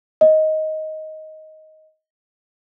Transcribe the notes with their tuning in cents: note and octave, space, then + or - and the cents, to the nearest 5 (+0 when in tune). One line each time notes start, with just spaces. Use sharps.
D#5 +10